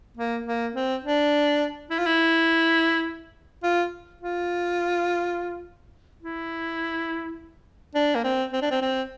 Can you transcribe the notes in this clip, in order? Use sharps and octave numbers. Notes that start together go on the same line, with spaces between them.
A#3
A#3
C4
D4
E4
F4
E4
F4
F4
E4
D4
A#3
C4
C4
D4
C4
C4